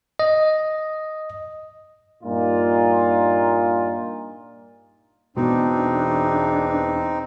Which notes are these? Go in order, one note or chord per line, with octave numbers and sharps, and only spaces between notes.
D#5
G2 A#2 D#4 F4
E2 B2 C4 D4 D#4